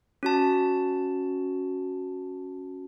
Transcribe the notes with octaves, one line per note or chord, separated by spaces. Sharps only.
C#4 F#4 A5